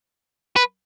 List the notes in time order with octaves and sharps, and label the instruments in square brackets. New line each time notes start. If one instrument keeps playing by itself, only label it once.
[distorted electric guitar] B4